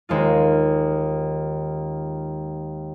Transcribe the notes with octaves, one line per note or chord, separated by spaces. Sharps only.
D#2 G#3 F4